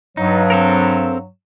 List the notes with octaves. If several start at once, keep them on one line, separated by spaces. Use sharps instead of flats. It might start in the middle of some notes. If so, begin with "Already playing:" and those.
G2 F#3 D#4
C4 A4 A#4